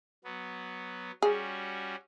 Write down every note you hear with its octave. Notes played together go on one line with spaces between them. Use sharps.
F#3 B3
G3 C#4 F#4 G#4